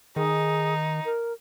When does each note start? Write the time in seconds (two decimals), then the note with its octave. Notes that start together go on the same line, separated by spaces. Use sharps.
0.16 D#3 D#4 G#4
1.05 A#4